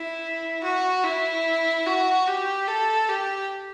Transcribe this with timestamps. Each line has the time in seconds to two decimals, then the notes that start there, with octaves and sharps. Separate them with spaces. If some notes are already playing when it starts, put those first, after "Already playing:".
Already playing: E4
0.64 F#4
1.04 E4
1.86 F#4
2.27 G4
2.68 A4
3.09 G4